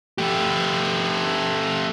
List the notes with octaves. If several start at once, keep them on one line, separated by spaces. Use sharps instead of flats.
A3 G4